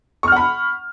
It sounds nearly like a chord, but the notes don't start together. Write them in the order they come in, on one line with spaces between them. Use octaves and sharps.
C#6 F6 F#5 B5